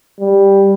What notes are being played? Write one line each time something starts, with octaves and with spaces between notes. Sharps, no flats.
G3